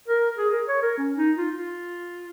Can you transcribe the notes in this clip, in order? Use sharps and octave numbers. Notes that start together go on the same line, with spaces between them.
A#4
G#4
A#4
C#5
A#4
C#4
D#4
F4
F4